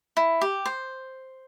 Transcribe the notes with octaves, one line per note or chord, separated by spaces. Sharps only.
E4
G4
C5